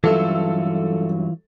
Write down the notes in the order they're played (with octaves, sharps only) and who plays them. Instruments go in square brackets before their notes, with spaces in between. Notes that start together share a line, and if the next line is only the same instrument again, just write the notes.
[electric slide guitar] G2 F#3 [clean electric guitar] E3 F4 E5 [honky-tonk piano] A4